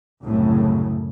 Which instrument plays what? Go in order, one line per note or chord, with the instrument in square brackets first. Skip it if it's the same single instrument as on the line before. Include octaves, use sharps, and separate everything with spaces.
[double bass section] C2 F#2 A2 C#3